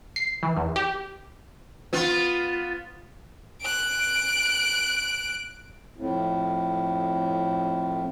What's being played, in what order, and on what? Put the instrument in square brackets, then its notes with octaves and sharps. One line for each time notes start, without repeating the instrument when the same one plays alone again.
[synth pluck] C7
E3
E2
G4
[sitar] B3 F4
[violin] F#6 D7
[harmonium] F2 A2